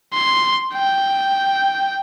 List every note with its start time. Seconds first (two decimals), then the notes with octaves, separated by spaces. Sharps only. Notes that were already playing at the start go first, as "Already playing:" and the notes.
0.13 C6
0.74 G5